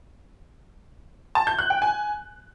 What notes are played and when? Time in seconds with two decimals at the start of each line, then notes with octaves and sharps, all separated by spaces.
1.35 A5
1.47 G6
1.59 F#6
1.70 G5
1.82 G#5